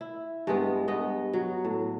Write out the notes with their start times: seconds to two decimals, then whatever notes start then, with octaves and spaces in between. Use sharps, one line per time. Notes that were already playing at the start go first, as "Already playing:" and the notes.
0.01 E4
0.47 G2 G#3 B3
0.88 G2 B3 D#5
1.33 F#3
1.64 A2